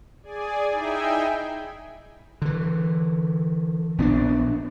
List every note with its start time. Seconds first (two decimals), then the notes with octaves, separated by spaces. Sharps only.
0.23 G#4 D5 G#5
0.70 D#4 E4 G#4 E5 G5 G#5
2.42 D3 E3
3.98 A#1 B3 C#4 D4